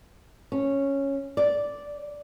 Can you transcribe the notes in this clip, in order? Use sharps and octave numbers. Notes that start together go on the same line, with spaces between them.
C#4
D5